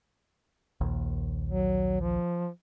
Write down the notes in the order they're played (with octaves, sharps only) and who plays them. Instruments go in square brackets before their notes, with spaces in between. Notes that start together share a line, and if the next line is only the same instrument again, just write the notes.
[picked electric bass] A#1 D#2
[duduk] F#3
F3